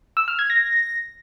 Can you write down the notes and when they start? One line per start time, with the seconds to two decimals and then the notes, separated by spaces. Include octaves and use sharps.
0.17 E6
0.28 F6
0.39 G#6
0.50 A#6